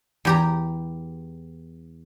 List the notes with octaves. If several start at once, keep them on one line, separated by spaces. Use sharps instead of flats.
E2 G4 A#5